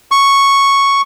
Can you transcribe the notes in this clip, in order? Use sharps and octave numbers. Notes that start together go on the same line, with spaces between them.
C#6